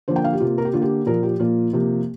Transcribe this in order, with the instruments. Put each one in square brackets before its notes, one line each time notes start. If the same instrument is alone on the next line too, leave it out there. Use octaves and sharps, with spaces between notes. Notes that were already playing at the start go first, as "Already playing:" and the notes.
[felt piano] D3 F3 A#3 C5
G5
F5
G4
C3 A#3 F4
A#4
G4
D3 A#3 F4
G4
A#2 F3 A#3 A#4
G4
A#2 F3 A#3 F4
C3 F3 A#3 G4